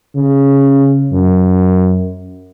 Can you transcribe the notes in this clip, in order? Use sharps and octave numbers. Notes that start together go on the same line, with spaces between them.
C#3
F#2